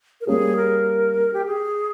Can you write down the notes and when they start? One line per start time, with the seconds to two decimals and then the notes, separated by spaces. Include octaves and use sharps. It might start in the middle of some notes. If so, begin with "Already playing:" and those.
0.21 A#4
0.27 G3 A#3 C#4 G4 G#4
0.56 A#4
1.34 G4
1.46 G#4